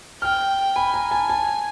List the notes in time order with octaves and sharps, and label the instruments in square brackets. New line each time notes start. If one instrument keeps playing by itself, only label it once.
[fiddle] G5 [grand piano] F6
[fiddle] G#5 [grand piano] B5
[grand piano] A#5
A5
A5